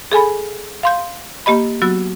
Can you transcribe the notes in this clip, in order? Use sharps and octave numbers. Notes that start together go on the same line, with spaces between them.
G#4 A4 G#5 B5
F5 C6 G6
A#3 G4 D#5 B5
F#3 B3 F#4 E6